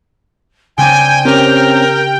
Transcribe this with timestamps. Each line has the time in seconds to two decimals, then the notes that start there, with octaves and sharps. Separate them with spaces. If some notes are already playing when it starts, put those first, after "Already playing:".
0.78 C#3 C4 D4 G5 G#5
1.25 C4 C#4 G4 A#4